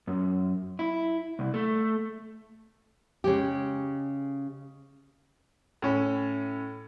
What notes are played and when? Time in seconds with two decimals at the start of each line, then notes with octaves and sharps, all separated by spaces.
0.07 F#2
0.79 E4
1.39 C2
1.54 A3
3.24 C#3 G#3 G4
5.82 A2 C#4